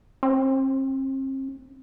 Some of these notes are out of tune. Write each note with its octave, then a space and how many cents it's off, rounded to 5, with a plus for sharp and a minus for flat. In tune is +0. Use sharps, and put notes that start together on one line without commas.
C4 +40